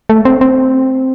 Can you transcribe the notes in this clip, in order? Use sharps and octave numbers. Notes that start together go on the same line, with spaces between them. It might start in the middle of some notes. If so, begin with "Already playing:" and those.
A3
C4
C4